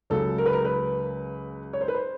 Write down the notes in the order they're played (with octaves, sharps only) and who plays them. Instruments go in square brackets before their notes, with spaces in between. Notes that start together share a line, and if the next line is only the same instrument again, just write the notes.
[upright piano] C#2 C#3 F#3 A4
A#4
B4
A#4
B4
C#5
C5
B4
C5